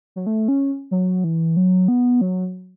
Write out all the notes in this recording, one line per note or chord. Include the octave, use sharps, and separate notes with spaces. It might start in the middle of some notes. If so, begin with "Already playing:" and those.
F#3
A3
C#4
F#3
E3
F#3
B3
F#3